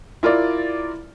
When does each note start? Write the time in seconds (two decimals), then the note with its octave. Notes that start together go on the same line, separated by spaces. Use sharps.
0.23 E4 F4 A#4 D5